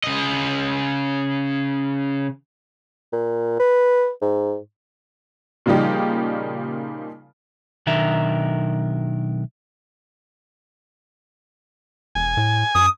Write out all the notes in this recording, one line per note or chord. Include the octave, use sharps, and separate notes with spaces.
C#3 D#5
A#2
B4
G#2
A#2 C#3 F3 G3 D#4 G4
B1 D#3 D4 A#4 E5
E1 G#5
A2
F#2 D#6